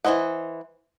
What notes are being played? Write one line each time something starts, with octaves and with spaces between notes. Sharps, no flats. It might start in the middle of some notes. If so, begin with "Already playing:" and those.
E3 F4 C5 D#5 F#5